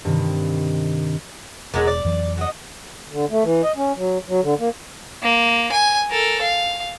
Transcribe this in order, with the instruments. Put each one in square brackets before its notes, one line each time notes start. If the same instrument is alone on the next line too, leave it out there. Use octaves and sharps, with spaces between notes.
[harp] G2 C3 D#3
[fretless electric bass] E1 [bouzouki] A#2 F#3 G#3
[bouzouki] D5
[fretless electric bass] F2 E3 F#3
[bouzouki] F#4 D#5
[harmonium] D3
A3
E3
D#5
C#4
F#3
F#3
D3
A#3
[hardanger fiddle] A#3
G#5
A4 A#4
F5